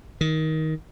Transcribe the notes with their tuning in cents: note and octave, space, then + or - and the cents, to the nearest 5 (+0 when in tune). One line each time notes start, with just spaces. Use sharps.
D#3 +15